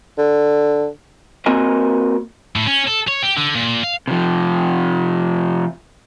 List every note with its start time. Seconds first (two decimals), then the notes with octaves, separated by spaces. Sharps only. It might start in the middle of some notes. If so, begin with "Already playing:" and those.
0.18 D3
1.46 A#3 C4 F#4 A#4 D#5 G#5
2.56 A2
2.67 C#4
2.88 A4
3.08 C#5
3.23 G4
3.37 D3
3.55 A#2
3.83 F5
4.08 C3 F3